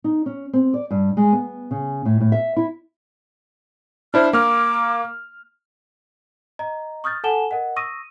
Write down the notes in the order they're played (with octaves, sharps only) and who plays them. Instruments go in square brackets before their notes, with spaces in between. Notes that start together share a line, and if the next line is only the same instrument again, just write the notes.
[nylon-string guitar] D#4
C#4
C4
D5
G2
G#3
B3
C#3
A2
A2
E5
E4
[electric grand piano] D4 E4 C5 [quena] F6
[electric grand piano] A#3 F6 [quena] D6
[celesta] D#5 A#5
C#6 D#6 F6 G6 A6
A4 F#5 G#5 A5 E7 G7
A#4 D#5 F#5
C#6 D#6 E6 A#6 D#7